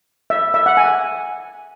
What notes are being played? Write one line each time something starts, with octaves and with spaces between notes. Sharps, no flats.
E5
E5
F#5
G#5